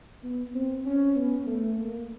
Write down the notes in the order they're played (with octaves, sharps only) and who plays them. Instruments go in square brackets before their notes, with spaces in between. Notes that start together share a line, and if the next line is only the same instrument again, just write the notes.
[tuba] B3
C4
C#4
B3
A3
A#3